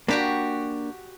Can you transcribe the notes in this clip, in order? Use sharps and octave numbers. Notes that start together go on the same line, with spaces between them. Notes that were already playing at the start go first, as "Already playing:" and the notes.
A#3 D4 F#4 G4 B5